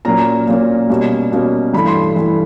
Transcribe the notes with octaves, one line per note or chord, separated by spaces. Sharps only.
A#2 F#3 A#3 C#4 A#5
A#2 F#3 A#3 C#4
B2 G3 A#3 C#4
B2 G3 A#3 C#4
G2 E3 A3 B5
C6
G2 E3 A3